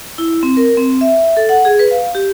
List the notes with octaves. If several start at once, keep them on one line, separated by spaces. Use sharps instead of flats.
E4
C4
A#4
C4
E5
A4
F#5
G#4
B4
F5
G4